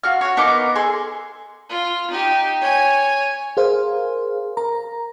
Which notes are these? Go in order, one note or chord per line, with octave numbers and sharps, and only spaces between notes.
F4 F#4 F6
F#4 C#5
B3 D#4 A#4 D6
G#4 A4 C6
F4
D#4 G4
C#5 G#5
G#4 A#4 C5 F5
A#4 A#5